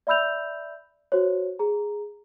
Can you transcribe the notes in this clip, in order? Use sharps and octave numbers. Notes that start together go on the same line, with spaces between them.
D5 E5 B5 E6 G6 F7
F#4 C5 C#5
G#4 A#5